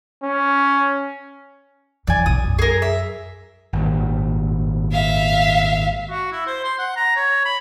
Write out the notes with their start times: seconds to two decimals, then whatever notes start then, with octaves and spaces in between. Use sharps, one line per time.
0.24 C#4
2.07 E2 E3 D5 G#5
2.26 B1 D#6
2.44 F#2
2.59 G#4 A#4
2.82 E5
3.73 G#1 G2 A#2
4.92 E5 F5
6.11 F#4
6.32 E4
6.47 C5
6.64 C6
6.79 F#5
6.96 A#5
7.16 C#5
7.45 B5